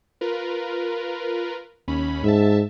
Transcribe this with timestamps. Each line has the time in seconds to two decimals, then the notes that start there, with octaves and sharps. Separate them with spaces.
0.21 F4 A#4 B4
1.88 D#2 C#4 B5
2.24 G#2 E5 A5